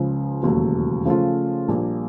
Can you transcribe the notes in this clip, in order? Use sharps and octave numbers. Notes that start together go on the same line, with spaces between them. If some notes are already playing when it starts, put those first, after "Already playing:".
Already playing: C#2 C#3 F3 G#3
E1 D#2 C#3 F#3 A3
C#3 F3 A3 C#4 F4
A#1 A#2 G3 A#3 D4